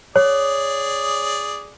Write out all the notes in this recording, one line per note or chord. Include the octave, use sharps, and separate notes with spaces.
G#4 C#5 D5